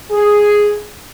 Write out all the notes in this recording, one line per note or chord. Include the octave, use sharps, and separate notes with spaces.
G#4